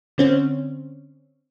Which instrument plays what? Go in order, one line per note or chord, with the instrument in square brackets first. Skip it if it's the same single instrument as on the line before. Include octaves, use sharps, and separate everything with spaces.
[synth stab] D3 C4 C#4